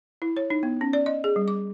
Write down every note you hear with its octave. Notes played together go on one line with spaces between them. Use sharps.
E4
C#5
D#4
B3
C#4
D5
D#5
G#4
G3
D6